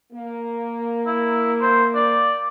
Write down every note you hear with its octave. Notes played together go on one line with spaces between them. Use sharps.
A#3
E4
C5
D5